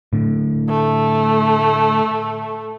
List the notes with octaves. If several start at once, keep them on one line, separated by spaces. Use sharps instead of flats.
A2 D3
A3